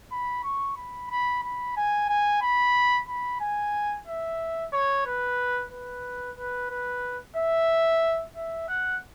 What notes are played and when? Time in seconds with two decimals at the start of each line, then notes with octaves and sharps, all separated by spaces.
0.12 B5
0.44 C#6
0.77 B5
1.10 B5
1.43 B5
1.77 G#5
2.09 G#5
2.42 B5
3.09 B5
3.40 G#5
4.07 E5
4.72 C#5
5.06 B4
5.72 B4
6.38 B4
6.70 B4
7.36 E5
8.35 E5
8.68 F#5